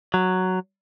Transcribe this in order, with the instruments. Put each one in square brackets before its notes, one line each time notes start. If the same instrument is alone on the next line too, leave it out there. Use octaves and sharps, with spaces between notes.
[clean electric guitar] F#3